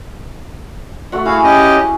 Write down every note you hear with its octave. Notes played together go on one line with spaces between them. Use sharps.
A3 F#4 F#5
E4 F#4 G#4 F5 G#5
C#4 G4 D#5